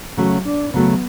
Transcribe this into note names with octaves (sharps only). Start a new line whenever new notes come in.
C#3 F#3 A3 C#4
D4
C#3 F#3 A3 B3